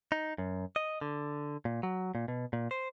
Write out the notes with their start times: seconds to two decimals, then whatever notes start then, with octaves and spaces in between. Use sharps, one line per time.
0.12 D#4
0.38 F#2
0.76 D#5
1.01 D3
1.65 A#2
1.83 F#3
2.15 A#2
2.28 B2
2.53 A#2
2.71 C5